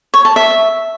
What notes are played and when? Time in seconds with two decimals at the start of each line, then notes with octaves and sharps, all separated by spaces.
0.14 C#5
0.25 A5
0.36 E5